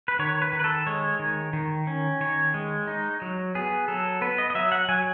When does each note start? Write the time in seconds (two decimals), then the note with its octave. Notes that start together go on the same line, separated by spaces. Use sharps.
0.08 B4
0.19 D#3 C#5
0.42 B4
0.53 D#3
0.59 B4
0.64 A4
0.87 G#3 C#5
1.19 D#3
1.53 D#3
1.87 C#4
2.21 D#3 C#5
2.54 G#3
2.87 D#4
3.22 F#3
3.55 B3 G#4
3.88 F#3 A4
4.21 B3 B4
4.38 D#5
4.50 D#5
4.55 F#3 E5
4.72 F#5
4.89 F#3 G#5